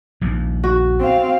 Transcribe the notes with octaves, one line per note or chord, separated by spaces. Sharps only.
A#1 D#2
F#4
C4 F5